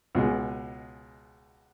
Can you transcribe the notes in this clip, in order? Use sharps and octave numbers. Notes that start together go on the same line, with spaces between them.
C#2 B2 G#3